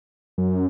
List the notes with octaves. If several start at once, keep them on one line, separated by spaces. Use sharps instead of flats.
F#2